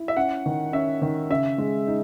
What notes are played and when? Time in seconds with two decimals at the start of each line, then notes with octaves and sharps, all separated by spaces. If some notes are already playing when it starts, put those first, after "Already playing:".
Already playing: E4
0.08 E5
0.17 C#4 F#5
0.46 D#3
0.73 C#4 E5
1.02 D#3
1.30 C#3 E5
1.58 G#3
1.87 D#4